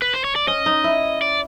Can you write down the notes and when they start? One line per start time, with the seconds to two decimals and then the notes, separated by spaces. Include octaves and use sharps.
0.02 B4
0.14 C5
0.24 C#5
0.36 D5
0.47 C#4 D#5
0.66 D#4
0.84 E4
1.22 D5